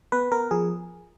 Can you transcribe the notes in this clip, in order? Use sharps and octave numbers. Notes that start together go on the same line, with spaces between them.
B3 B4
B3 A#4
F3 G#4